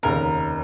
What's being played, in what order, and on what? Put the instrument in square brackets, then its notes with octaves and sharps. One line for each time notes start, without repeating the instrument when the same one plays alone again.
[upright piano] F1 D#2 C#3 [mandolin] A#4